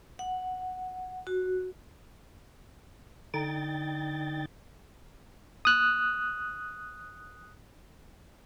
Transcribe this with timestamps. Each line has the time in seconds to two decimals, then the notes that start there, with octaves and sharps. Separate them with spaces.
0.19 F#5
1.27 F#4
3.34 D3 D#4 G5 A6
5.65 D#6 F#6